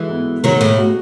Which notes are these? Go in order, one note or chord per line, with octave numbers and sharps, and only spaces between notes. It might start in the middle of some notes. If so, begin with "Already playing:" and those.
Already playing: E3 G#3 F#4 A4
B3
D#3 F#3 G#3
A2
F#4